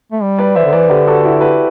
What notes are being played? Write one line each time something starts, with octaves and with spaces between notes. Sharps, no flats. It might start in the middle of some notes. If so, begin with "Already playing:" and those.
A3
G3
B4 D5
E3 C5 E5
D3
E3 B4 D5
D3 G4 B4
F#4 A4
E4 G4
G4 B4